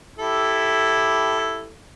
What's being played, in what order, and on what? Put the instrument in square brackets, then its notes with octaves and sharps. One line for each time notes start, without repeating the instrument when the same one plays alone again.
[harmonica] E4 G4 A4